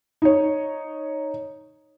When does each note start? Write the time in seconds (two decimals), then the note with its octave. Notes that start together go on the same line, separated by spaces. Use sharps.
0.22 D#4 C#5